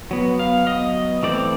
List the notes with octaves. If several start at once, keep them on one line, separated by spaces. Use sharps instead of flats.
F#3 B3
F5
D#5
E3 A3 C4 D5